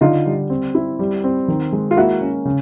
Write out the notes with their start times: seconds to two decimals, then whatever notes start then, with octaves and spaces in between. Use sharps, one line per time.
0.01 D3 D#4 F4
0.26 G3
0.50 C4
0.75 E4
0.99 G3
1.24 C4
1.48 D#3
1.72 G#3
1.91 F4
1.97 A#3 E4 F#4
2.21 C#4
2.45 C#3